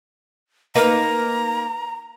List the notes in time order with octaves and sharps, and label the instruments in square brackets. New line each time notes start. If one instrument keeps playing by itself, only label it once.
[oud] A#3 D#4 B4 [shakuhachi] A#5